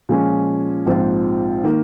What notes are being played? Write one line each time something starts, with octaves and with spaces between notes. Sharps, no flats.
A#2 F3 G#3 C#4
A#1 G#2 F3 C4 F4
D#3 A#3